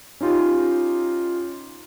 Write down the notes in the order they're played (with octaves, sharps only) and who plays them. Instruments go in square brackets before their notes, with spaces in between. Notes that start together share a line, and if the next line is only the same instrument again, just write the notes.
[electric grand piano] C#4 D#4 F4 G4